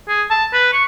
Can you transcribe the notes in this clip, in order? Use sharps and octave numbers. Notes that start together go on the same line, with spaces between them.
G#4
A5
B4
C#6